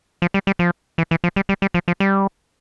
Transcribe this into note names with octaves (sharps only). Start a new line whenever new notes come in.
F3
G3
G3
F3
E3
E3
F3
G3
G3
G3
F3
F3
G3